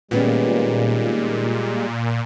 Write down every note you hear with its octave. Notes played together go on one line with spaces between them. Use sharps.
A#2 D#3 G3 G#3 B3 C#4